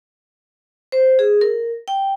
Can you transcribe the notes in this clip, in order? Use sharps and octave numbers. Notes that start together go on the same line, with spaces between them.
C5
G#4
A#4
G5